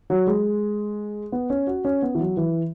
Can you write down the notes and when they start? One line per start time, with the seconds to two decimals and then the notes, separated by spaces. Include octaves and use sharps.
0.10 F#3
0.27 G#3
1.32 B3
1.50 C#4
1.67 F#4
1.85 C#4
2.02 B3
2.15 E3
2.19 F#3
2.37 E3